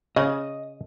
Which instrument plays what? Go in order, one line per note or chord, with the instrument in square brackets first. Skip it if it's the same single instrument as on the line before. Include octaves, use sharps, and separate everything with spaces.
[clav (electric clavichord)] C#3 [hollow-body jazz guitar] D#5